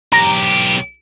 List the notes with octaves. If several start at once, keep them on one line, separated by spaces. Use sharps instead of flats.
B1 G4 A#5